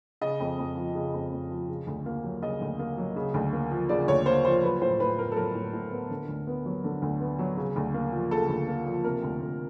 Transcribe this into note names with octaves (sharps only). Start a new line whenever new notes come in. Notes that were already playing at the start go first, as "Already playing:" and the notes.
C#3 D#5
F2
F2
F3
C#3
F2
F2
F3
C#3
D2
A#3
F#3
C#3 D#5
D2
A#3
F#3
C#3
D2
A#3
F3
C#3 D5
D2 C#5
A#3 C5
F3 C5
F#3 B4
A2 C5
A2 B4
B3 A#4
A4
F#3 A#4
A2
A2
B3
D3
D2
B3
F#3
D3
D2
B3
F#3
C#3
D2
A#3
F3
C#3 A4
D2
A#3
F3
C3 A#4
D2
D2